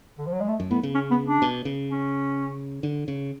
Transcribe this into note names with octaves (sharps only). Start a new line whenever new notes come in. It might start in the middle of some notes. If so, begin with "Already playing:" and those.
D3
F3
F#3
G#3
A3
F#2
A2 B3
C#3
C#4
B3
D4
B2
C#3
C#4
D3
C#3